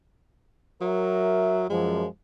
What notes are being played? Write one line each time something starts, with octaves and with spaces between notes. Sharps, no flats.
F#3 A#4 E5
F#2 F3 G#3